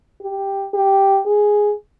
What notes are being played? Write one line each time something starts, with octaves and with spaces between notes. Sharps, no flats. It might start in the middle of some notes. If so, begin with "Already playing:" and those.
G4
G4
G#4